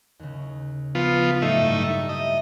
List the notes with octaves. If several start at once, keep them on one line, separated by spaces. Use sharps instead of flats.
D#2 C#3
F3 B3 F4
A2 F#3 G3 A3 D#4 E5
G2 A#3
G4 D#5 E5 A5